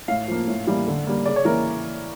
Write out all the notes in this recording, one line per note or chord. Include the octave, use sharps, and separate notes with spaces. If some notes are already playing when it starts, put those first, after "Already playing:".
A2 F5
F3 A#3
A2
E3 G3 A#3
D3
G3 A#3
C#3 D5
C#5
E3 A#3 A#4